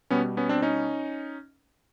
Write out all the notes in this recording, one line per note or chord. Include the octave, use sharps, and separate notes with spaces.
B2 G3 B3 C#4
B3 C#4
C4 D4
C#4 D#4